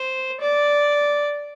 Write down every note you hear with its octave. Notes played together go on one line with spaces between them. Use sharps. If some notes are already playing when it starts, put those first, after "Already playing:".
Already playing: C5
D5